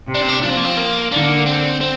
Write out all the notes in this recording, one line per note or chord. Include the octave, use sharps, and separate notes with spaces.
C3
D4
C4
D4
F3 D4
C4
A#3
C4
A#3
D3 A#3
C4
C4